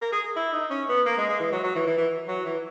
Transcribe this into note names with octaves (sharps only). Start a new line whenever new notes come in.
A#4
G#4
E4
D#4
C#4
B3
A#3
G#3
G#3
E3
F#3
F#3
E3
E3
E3
F#3
E3